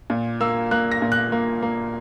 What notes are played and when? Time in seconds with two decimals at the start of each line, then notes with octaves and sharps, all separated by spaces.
0.10 A#2
0.41 A#3 E6
0.71 A#3 F#6
0.92 A#6
1.02 A#2
1.12 F#6
1.32 A#3
1.63 A#3